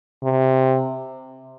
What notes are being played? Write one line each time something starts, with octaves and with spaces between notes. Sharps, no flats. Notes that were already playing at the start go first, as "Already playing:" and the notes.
C3